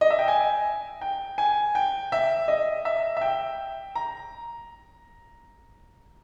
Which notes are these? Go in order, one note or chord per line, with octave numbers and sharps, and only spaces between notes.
D#5
E5
G5
G#5
G5
G#5
G5
E5
D#5
E5
E5
G5
A#5